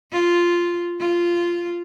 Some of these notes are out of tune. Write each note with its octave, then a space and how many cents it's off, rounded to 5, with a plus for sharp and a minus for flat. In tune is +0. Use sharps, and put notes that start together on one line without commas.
F4 -5
F4 -10